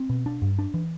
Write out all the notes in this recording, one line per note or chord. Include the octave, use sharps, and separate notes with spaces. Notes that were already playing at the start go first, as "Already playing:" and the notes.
Already playing: C4
B2
D4
G2
D4
E3